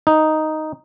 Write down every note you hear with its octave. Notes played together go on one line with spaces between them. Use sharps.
D#4